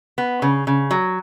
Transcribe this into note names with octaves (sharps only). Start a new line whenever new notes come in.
B3
C#3
C#3
F#3